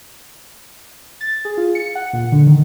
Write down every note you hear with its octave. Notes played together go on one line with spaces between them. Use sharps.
A6
G#4
F4
C#7
F#5
A#2
D3
D#3